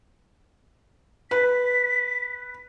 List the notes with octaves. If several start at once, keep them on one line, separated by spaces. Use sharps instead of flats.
B4 B6